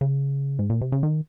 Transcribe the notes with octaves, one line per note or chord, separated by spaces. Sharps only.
C#3
G#2
A#2
C3
C#3
D#3